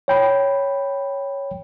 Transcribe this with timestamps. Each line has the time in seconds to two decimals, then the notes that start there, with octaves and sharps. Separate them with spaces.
0.08 C#5 G5 B5